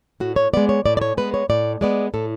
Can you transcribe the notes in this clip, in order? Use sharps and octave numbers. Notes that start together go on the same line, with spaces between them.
A2 F#4
C#5
G#3 B3 D5
C#5
A2 D5
D5
C#5
G#3 B3 B4
C#5
A2 D5
G#3 B3 D5
A2 A4